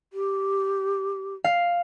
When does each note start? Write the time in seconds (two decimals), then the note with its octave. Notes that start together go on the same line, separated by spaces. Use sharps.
0.13 G4
1.44 F5